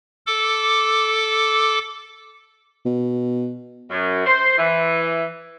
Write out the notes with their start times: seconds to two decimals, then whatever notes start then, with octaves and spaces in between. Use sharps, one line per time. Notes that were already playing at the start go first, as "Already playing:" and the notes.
0.26 A4 D6
2.85 B2
3.90 F#2
4.27 C5
4.58 E3